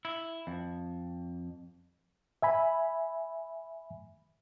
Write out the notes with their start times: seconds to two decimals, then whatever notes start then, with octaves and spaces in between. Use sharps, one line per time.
0.05 E4
0.47 F2
2.42 E5 G#5 B5